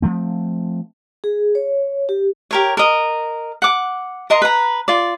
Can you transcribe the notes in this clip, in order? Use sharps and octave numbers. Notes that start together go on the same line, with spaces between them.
F3 A3 C4
G#4
C#5
G4
G4 A#4 C#5
A#4 D#5
F#5 D6
A#4 D#5 A#5 C6
B4 A#5
F4 D5